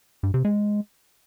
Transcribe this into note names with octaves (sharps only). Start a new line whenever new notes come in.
G2
C3
G#3